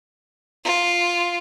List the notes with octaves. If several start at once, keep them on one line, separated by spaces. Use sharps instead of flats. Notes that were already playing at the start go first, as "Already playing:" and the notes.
F4